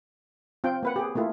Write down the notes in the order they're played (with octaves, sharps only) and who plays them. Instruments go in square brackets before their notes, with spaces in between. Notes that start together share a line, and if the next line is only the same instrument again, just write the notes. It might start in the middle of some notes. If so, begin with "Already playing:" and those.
[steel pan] C4 F4 G5
A#3 B4 F#5
G4 G#4
A3 A#3 E4 F4